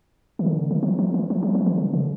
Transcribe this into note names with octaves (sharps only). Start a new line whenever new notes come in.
D#3
D3
D#3
D3
D#3
F3
F3
E3
F3
F#3
F3
E3
D3
C#3